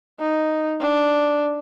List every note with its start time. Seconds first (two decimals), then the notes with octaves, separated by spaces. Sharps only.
0.20 D#4
0.80 D4